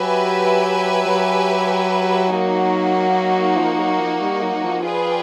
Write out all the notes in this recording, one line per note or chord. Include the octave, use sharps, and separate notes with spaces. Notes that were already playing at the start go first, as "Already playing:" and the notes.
Already playing: F#3 G4 B4 E5 G#5
F#3
F#3 A#3 D#4 F#4
F3
F#3
F3
G3
F#3
F#3
F3
F4 G#4 B4 D5 G5